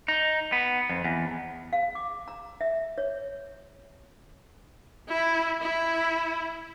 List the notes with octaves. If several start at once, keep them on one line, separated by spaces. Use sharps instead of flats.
D#4
B3
F2
E2
F5
D6
A#5
E5
C#5
E4
E4